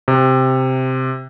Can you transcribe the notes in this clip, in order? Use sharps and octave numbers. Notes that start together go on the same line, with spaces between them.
C3